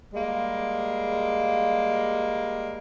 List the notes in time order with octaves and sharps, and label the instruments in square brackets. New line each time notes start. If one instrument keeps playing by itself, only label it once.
[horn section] G3 G#3 A#3